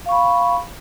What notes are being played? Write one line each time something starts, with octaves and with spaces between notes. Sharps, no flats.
F5 B5 C#6